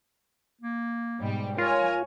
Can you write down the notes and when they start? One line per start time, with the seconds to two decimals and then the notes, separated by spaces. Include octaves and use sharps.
0.61 A#3
1.19 G#2 B2 G3
1.58 F4 A#4 C#5 G#5